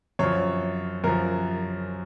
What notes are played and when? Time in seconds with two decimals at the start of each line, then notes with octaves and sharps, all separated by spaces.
0.19 F#2 F3 C#5
1.04 F#2 F3 A#4